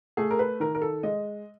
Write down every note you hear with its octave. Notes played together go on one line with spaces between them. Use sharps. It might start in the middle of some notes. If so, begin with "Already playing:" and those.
A3 G#4
A#4
B4
D#3 A#4
A#4
A4
G#3 D#5